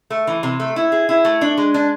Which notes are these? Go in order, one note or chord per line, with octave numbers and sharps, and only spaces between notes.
A3
E3
C3
A3
E4
G#4
E4
A3
D4
G#3
D4